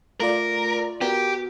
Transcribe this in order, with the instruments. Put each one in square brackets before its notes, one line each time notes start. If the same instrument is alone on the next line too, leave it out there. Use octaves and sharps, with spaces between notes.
[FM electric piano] A3 F4 D5 [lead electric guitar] A#4
[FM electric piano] B3 F#4 A#4 [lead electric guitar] G4